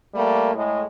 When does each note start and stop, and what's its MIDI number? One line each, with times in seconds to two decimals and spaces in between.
0.15 0.54 55
0.15 0.54 57
0.15 0.54 58
0.54 0.82 45
0.54 0.82 56